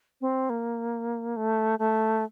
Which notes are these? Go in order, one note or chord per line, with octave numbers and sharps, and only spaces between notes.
C4
A#3
A3
A3